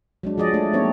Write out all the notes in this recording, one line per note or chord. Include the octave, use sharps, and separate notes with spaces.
F#3 G#3 D4
F3 G#4 D5 D#5
A3 D4
A#3 C4 D#4 C#5